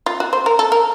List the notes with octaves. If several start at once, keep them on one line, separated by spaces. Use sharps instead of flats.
F4
F#4
C5
A#4
A4
A#4